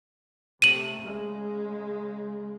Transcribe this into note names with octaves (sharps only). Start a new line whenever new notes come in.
C3 A3 D#7 E7 F#7
C#3 G#3